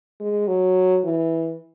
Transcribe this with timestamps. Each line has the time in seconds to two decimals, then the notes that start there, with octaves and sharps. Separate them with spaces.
0.20 G#3
0.48 F#3
1.05 E3